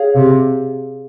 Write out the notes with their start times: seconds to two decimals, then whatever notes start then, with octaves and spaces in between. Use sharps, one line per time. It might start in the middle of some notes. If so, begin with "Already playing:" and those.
Already playing: G#4 C#5 F5
0.15 C3